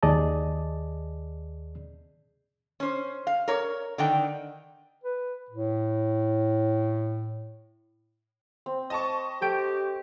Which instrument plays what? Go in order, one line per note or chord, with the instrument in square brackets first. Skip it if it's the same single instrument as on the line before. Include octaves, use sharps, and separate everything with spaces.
[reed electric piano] D#2 G#4 D5 D#5 A5
[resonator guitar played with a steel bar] C#4 C5
F5
A#4 C#5
D3 D#3 G5
[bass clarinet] B4
A2
[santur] C4
[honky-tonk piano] D#5 A5 C#6
[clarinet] G4 [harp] A4 G5 D7